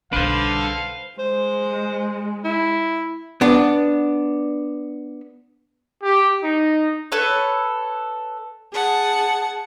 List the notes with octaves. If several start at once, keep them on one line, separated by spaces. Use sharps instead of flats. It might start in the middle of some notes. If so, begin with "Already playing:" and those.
B1 G3 D4 A4 B4 C5 F5
G#3 C5
E4
B3 D4
G4
D#4
A4 B4 C#5
G#4 F#5 A5